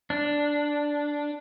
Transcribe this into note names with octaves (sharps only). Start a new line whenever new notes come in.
D4